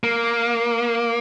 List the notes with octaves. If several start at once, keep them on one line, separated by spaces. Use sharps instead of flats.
A#3